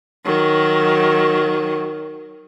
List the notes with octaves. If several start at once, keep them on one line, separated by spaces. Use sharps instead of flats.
D#3 F#3